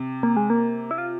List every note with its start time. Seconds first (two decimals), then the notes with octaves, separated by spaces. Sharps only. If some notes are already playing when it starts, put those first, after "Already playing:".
Already playing: C3
0.23 A#3
0.37 G#3
0.50 A#3
0.91 E4
0.98 F4